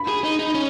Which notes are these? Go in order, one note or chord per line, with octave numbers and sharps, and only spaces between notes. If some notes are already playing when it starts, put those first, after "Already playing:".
Already playing: B5
G#4
D#4
D#4
C#4